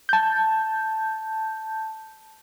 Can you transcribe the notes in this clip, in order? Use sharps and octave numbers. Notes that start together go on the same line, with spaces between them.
A5 G6